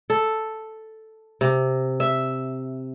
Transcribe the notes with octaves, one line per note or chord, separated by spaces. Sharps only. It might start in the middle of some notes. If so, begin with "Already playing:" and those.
A4
C3
E5